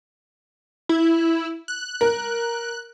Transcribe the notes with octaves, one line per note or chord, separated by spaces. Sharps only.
E4
F#6
A#4